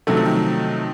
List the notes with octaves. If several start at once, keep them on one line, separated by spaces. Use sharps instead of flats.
C3 D#3 F#3 A3
F3
D#3